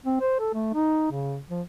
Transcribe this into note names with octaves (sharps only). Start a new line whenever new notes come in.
C4
C5
A4
A3
D#4
C#3
F3